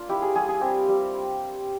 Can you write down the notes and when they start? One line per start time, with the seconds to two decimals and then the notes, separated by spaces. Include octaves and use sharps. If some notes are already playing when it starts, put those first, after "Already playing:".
Already playing: A#3 D4 F4
0.09 E4 G4
0.22 G#4
0.35 G3 G#4
0.48 G#4
0.61 C4 G4
0.88 G3